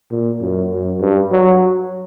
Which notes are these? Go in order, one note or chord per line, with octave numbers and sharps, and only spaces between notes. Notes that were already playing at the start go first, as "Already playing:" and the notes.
A#2
F#2
F#2
G2
F#3